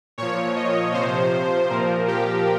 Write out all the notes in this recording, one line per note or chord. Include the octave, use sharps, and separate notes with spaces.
A#2 F3 C#5
D#5
C3 F3 C5
A#2 F3 A#4
G4